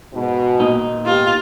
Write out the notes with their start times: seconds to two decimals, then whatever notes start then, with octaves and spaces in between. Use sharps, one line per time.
0.13 G#2 B2
0.60 A#2 D#4
1.06 G#2 B3 F4 G4